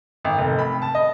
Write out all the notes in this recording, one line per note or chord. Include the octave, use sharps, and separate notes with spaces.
G#1
F1
B5
A5
D#5